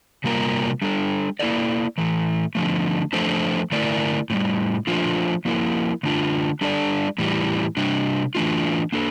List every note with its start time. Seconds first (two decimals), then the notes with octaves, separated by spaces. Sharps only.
0.24 C3 G3 A#3 F4 A#4
0.82 G3 D4 A4
1.39 A#3 E4 A4 D5
1.98 A2 E3 A3
2.55 D3 F3 A3
3.13 F3 A3 D4 A4 C5
3.72 D3 A3 E4 A#4 D5
4.30 A2 E3 G3
4.87 F3 A3 D4 F4 C5
5.45 F3 A#3 E4 A#4
6.03 D3 A3 D4 F4
6.61 G3 D4 A4 D5
7.18 A2 E3 G3
7.77 C3 G3 D4
8.35 E3 A3 D4 F4
8.92 A#3 D4 A4